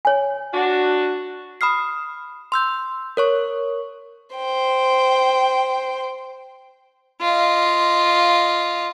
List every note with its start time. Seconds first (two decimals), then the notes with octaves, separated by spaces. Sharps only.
0.05 C#5 G#5
0.53 D4 F#4
1.61 B5 D#6 F6 C7
2.52 C6 E6 G6
3.17 A#4 C#5 C#6
4.36 C5 G5
7.21 F4 D#5